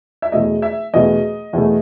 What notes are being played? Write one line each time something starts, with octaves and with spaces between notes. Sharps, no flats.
E5
E2 B2 A3 D#5
E5
E2 B2 A3 D#5
E2 B2 A3